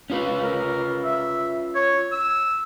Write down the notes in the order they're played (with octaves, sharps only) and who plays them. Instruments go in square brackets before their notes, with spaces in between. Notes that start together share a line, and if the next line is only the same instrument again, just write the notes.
[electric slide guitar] C#4 F4 B4
[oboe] A#4
E5
C#5
E6